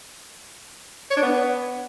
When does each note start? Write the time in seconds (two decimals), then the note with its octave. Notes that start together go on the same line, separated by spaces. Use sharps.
1.11 C#5
1.17 D4
1.22 B3